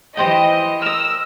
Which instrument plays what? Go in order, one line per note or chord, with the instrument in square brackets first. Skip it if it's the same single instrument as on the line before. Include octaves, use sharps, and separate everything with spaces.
[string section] E3 D#5 [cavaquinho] G4 C5 G5
[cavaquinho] A#4 D#5 [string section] E6